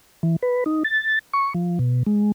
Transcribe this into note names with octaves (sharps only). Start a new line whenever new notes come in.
E3
B4
D#4
A6
C#6
F3
B2
G#3